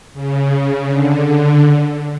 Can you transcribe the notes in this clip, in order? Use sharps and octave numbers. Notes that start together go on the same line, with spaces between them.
C#3
D3
D3